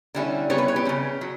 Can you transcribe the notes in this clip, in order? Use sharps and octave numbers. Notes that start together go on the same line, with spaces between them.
D3 G3 C#4 E4
C#3 G3 B3 E4 C#5
B4
C#5
G4
C#3 G3 C#4
F#3